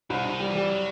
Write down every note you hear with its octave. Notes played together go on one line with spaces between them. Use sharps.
C2 B2
C2 D#3
G3
E3
G3
F#3